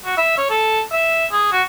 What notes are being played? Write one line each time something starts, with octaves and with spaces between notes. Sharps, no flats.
F#4
E5
C#5
A4
E5
G#4
F#4